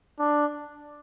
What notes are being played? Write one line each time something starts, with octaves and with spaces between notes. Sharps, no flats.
D4